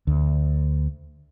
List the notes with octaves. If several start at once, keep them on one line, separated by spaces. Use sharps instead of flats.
D2